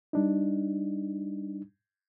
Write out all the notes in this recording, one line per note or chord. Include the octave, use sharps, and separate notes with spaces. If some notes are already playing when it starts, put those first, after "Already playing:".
G3 D4 D#4